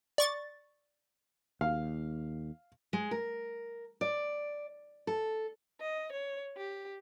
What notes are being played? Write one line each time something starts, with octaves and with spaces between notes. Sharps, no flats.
D5 C#6 A6
D#2 F5
G#3
A#4
D5
A4
D#5
C#5
G4